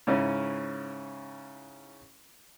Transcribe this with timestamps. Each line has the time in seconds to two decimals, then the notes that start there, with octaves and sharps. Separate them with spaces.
0.07 G#2 C#3 C#4 E4